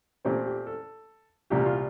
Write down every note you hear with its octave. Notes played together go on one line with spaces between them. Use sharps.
A#2 A3 C4 G4
G4
A4
C2 A#2 G3 G4
F4